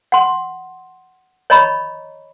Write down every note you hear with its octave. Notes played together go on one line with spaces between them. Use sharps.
F#5 C6
C#5 D#5 A#5 B5 C#6